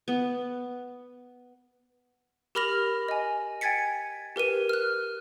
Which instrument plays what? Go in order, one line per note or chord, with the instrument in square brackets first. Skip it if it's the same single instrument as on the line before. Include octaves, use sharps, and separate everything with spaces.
[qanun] B3
[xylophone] G4 A#4 B5 F6 A#6 F7
D#5 G#5
G5 G#5 G#6 A6 B6 C#7
G4 A#4 B4 D#7
F6 F#6